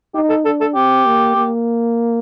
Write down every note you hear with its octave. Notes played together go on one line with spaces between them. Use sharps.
D#4 G4
A4
D4 A4
A4
C4 G4
A#3
A#3